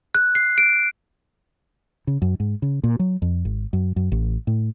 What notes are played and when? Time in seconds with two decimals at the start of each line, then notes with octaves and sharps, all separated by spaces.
0.15 F#6
0.35 C7
0.58 D7
2.07 C#3
2.22 F#2
2.40 G#2
2.62 C#3
2.83 A#2
2.99 F#3
3.22 F2
3.45 G#1
3.73 F#2
3.96 F#2
4.12 A1
4.47 A2